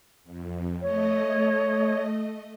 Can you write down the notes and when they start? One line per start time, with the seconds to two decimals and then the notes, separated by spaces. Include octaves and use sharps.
0.24 F2
0.81 A3 C#5 D#5